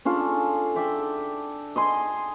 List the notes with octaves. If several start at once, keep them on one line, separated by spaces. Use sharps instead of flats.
C#4 D4 F4 A4
D5 E5 G5
D#5 G#5 C6